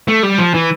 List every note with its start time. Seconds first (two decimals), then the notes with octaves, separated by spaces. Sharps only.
0.08 A3
0.23 G3
0.38 F3
0.54 E3